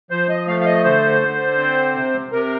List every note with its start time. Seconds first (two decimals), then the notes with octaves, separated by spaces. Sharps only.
0.11 F3 C5
0.29 D#5
0.48 A3 F5
0.61 F5
0.65 D#5
0.84 D3 C5
1.21 D3
1.58 C4
1.95 C3
2.32 C3 A#4